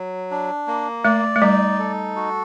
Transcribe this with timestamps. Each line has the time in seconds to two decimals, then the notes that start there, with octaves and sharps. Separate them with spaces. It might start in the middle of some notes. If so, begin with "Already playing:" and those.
Already playing: F#3
0.31 D4
0.67 A#3
1.05 A3 D5
1.36 A3
1.42 G3 D#4
1.79 A4
2.16 F#4